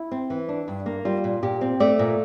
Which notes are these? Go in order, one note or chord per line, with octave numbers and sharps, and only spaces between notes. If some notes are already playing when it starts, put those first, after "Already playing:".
Already playing: E4
C4
E3
D4
G2
A#3
G3 F4
A#2
A#2 G4
C4
A3 D5
A#2